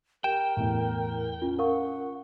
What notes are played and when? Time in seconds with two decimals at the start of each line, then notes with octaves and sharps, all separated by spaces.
0.24 G4 A#4 G5 E7
0.57 E2 A2
1.42 C#4 F4
1.59 A#4 F5 F#5 C#6